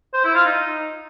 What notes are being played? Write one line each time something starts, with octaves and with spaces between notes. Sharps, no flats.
C5
E4
F4
D#4